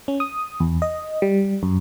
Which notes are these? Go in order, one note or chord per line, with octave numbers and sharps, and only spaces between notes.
C#4
D#6
E2
D#5
G3
F#2